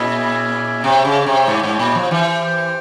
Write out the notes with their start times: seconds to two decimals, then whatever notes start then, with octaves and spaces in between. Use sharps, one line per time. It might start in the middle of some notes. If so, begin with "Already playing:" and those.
Already playing: A#2 C#4 E4 G#4 E5 G#5
0.84 C3 G4 C#5 G5
1.05 C#3
1.26 C3
1.47 G#2
1.63 G#2
1.79 A#2
1.95 F3
2.11 E3 G4 C5 G5